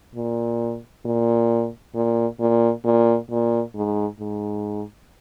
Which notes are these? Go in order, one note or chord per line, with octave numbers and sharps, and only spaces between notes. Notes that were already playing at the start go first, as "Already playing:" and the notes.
A#2
A#2
A#2
A#2
A#2
A#2
G#2
G#2